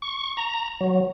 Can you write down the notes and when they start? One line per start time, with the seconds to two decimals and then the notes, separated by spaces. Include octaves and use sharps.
0.02 C#6
0.37 A#5
0.81 F#3